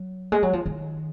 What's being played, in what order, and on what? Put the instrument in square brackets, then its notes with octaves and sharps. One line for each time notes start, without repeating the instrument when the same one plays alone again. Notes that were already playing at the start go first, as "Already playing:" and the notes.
Already playing: [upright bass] F#3
G#3
F#3
F3
D#3